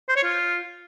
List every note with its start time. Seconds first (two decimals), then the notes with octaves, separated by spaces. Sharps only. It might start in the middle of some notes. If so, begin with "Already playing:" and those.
0.09 C5
0.16 C#5
0.24 F4